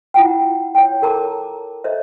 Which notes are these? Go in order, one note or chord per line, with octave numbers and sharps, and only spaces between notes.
E4 F4 F#5 G5
C#5 G5
A4 A#4 A5 A#5 D6
A4 C5 C#5 D#5 E5